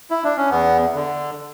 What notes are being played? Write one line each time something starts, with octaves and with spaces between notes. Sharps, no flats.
E4
D4
C#4
E2 B3
D3